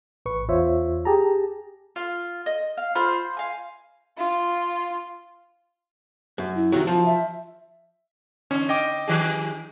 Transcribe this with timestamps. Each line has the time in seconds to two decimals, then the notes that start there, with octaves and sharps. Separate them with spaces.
0.26 A1 B4 C#6
0.48 E2 F4 C5 C#5 E5
1.05 G4 G#4 A5 A#5
1.96 F4
2.46 D#5
2.77 F5
2.95 F4 C5 B5 D#6
3.37 F5 G#5
4.18 F4
6.38 F#2
6.56 E4
6.72 C3 D#3 F#3
6.87 F3 F4
7.06 E5
8.51 D3 C#4
8.69 D#5 G5 D6
9.07 D#3 G4 G#4